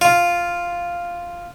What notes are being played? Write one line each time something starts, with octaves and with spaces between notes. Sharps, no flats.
F4